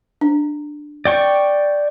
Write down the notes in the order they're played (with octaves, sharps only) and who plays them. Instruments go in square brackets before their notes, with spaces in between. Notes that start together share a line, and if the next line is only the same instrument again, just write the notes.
[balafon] D4
[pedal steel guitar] D5 G5 C#6